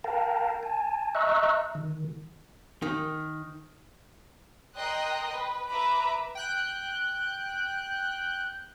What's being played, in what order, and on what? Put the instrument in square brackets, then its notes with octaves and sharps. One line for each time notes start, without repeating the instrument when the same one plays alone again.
[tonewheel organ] A#4 F5 G5 A5 A#5
G#5 A5
D#5 E5 A#5 C#6 E6 F#6
D#3
[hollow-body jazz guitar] D#3
[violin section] A#4 D#5 G5 C6 D#6 F#6
B4
B4 E5 A#5 B5 D6
[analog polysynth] G5 F#6 G6